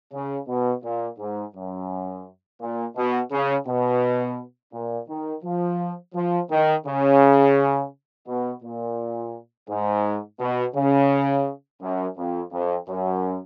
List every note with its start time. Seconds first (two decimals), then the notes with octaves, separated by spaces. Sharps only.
0.13 C#3
0.48 B2
0.83 A#2
1.19 G#2
1.55 F#2
2.60 A#2
2.96 B2
3.32 C#3
3.67 B2
4.73 A#2
5.09 D#3
5.44 F3
6.15 F3
6.50 D#3
6.86 C#3
8.27 B2
8.63 A#2
9.69 G#2
10.40 B2
10.75 C#3
11.81 F#2
12.17 F2
12.52 F2
12.88 F#2